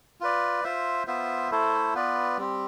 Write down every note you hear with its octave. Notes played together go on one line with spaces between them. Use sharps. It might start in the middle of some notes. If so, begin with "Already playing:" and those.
F4 B4 D5
F4 C5 E5
B3 F4 C5 E5
A3 E4 A4 C5
B3 F4 B4 D5
G3 C4 G4